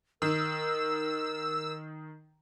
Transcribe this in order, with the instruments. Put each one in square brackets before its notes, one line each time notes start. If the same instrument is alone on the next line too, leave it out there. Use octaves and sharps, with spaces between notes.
[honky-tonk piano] D#3 [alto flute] A#4 [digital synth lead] E6